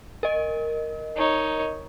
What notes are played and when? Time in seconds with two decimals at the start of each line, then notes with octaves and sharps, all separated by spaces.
0.23 A#4 D#5
1.16 D#4 C#5